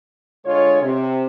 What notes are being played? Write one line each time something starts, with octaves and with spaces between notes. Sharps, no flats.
D3 G#3 F4 C#5
C3